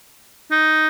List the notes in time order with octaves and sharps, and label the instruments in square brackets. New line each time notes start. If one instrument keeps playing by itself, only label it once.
[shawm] D#4